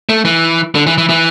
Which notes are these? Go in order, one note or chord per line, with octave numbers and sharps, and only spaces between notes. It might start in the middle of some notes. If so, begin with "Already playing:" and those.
A3
E3
D3
E3
E3
E3